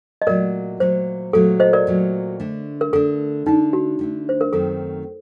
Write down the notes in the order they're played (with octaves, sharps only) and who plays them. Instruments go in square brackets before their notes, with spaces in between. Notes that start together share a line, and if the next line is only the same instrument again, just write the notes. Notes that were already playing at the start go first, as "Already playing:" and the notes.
[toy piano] D#5
[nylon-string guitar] A#2 F#3 A3 [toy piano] A#4 D5
[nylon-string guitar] A#2 F#3 A3 [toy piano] C5
[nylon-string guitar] A#2 F#3 A3 [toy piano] A4
[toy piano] C5 D#5
A#4 D5
[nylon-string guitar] A#2 F#3 A3
D3 A3 D4
[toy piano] A#4
[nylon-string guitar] D3 A3 D4 [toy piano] A4
[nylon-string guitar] D3 A3 D4 [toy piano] D#4
[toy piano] F#4
[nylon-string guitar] D3 A3 D4
[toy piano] C5
A#4
[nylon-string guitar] F#2 D#3 A3 C4 [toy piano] A4